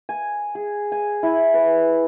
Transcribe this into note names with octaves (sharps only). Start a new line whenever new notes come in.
G#5
G#4
G#5
E4
B4